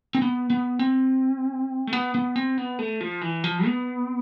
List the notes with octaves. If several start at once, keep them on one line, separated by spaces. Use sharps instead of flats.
C4
B3
B3
C4
A3
B3
B3
C4
B3
A3
F3
E3
F3
B3